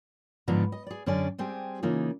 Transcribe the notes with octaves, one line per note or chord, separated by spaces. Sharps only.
G#2 D3 F3 B3 D4 A#5
D#5
G#4 D5
F#2 D3 C#4 G#4 D5 G#5
G3 C4 G4 G#4
C#3 E3 A#3 D#4 F4 G#4